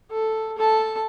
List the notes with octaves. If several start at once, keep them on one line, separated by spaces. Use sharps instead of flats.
A4
A4 A5